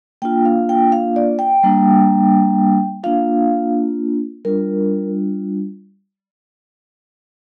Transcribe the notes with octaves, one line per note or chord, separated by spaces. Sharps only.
A#3 D4 F4 G5
F5
G5
F5
D5
G5
G3 A#3 D4
A#3 D4 F4 F5
G3 D4 F4 A#4